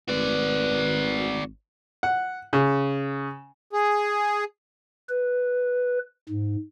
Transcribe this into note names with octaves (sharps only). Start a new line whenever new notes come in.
G#1 F#4 B4 D5
F#5
C#3
G#4
B4
G#2